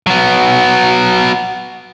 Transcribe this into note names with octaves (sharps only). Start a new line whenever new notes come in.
F#3 B3